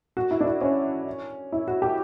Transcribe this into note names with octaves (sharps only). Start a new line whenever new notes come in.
F#4
E4
D4
E4
C#4
E4
F#4
G4